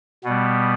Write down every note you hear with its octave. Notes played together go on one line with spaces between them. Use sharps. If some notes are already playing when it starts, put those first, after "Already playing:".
B2 G3 B3